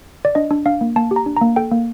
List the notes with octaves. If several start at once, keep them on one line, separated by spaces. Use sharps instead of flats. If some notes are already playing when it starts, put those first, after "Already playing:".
D5
D4 D#5
D4
D4 F5
A#3
A#3 A5
G4
A#5
D4
A#3 A#5
A4 G5
A#3